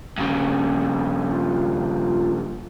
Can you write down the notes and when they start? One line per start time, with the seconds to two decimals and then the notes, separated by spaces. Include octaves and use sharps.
0.18 G2 C#3
1.32 F4